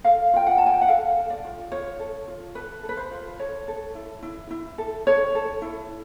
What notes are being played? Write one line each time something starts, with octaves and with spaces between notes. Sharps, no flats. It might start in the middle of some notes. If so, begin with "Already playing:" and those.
A4 F5
F4 G5
F#5
F4 A5
G#5
G5
F#5
A4 F5
A4
D5
F4
F4 C#5
A4
F4
A4 B4
A4
B4
C5
F4
A4 C#5
A4
E4
E4
E4
A4
A4 C#5
A4
E4